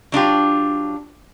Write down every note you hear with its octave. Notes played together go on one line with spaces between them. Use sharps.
F#3 D4 F4 G4